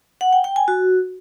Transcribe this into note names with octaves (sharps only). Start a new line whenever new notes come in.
F#5
G5
G5
G#5
F#4